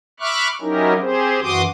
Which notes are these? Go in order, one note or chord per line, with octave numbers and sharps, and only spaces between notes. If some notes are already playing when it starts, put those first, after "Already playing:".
E5 B5 C#6 D6 F6 F#6
F#3 C#4 D#4 E4 G4 A#4
C4 G4 G#4 C5
F#2 E3 F#4 C6 D6 D#6